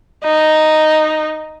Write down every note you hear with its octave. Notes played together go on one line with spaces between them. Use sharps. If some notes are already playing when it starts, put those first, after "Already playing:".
D#4